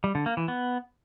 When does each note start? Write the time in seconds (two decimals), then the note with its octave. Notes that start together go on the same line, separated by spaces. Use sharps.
0.04 G3
0.15 D3
0.26 A#3
0.37 E3
0.48 B3